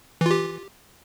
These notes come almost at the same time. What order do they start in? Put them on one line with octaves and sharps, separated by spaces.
E3 F4 G4